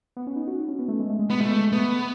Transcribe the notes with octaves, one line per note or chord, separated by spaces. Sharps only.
B3
C#4
D#4
F#4
C#4
B3
A3
G#3
A3
G#3
B3
G#3 A3
G#3
A3 B3